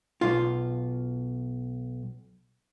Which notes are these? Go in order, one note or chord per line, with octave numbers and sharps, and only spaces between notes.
B1 F4